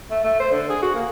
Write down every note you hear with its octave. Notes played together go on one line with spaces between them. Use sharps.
A3
A3
C5
D3
G#4
F#4
A#3